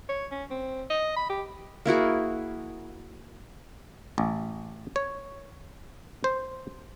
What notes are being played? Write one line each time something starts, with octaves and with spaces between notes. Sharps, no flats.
C#5
C#4
C4
D#5
B5
G4
A#3 E4 F#4 G#4
A1
C#5
C5